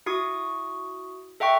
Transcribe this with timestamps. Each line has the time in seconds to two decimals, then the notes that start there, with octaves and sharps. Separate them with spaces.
0.06 E4 F#4 C#6 D#6
1.40 A4 E5 F#5 G5 C#6